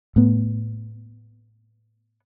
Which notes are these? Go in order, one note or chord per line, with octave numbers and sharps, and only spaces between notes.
A2 B3